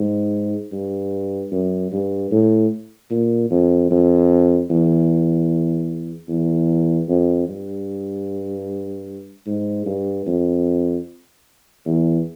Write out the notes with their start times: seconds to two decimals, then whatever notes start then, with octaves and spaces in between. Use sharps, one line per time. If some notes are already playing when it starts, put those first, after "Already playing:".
Already playing: G#2
0.72 G2
1.52 F#2
1.92 G2
2.31 A2
3.11 A#2
3.50 F2
3.91 F2
4.70 E2
6.29 E2
7.09 F2
7.48 G2
9.46 G#2
9.86 G2
10.26 F2
11.85 E2